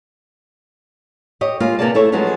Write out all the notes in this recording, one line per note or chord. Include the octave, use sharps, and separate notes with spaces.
G4 C#5 D#5
G3 G#3 A#3 F4
C3 A#3 B3 G#4 D5 A5
A3 E4 A4 C#5
F3 F#3 G#3 A3 B3 C#4